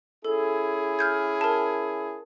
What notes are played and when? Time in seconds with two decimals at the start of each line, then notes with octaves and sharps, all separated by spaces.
0.25 C#4 E4 G#4 A4
0.99 F6 G6 G#6
1.41 A#4 A5